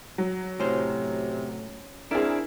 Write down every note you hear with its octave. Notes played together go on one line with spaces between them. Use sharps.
F#3
A2 C3 C#4 C5
C4 D4 E4 G#4 A#4